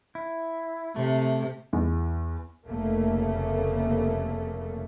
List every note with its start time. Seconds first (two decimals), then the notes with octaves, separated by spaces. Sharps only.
0.15 E4
0.96 C3 A3
1.73 E2
2.67 F1 C#3 A3 A#3